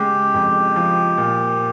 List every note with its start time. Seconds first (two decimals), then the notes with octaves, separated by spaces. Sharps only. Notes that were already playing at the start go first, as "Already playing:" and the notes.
Already playing: C#3 G#3 G4
0.34 F2
0.76 F3
1.17 A#2